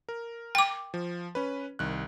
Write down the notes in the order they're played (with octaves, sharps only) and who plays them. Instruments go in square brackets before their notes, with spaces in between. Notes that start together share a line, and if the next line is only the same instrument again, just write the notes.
[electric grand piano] A#4
[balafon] G5 D6
[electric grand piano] F3
C#4 B4
C2 D#3 F#6